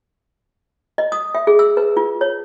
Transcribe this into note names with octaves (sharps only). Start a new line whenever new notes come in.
D#5
D#6
E5
G#4
E6
B4
F4
C#5